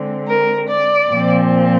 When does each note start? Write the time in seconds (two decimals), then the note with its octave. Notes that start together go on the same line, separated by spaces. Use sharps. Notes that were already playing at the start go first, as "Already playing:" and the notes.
Already playing: D3 G#3 C4
0.27 A#4
0.69 D5
1.10 A#2 F3 C4